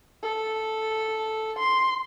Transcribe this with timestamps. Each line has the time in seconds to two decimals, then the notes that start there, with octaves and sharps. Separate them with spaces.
0.24 A4
1.59 C6